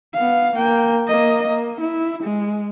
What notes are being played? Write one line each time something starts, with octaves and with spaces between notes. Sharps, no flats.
B3 F5
A#3 G5
A#3 D#5
A#3
E4
G#3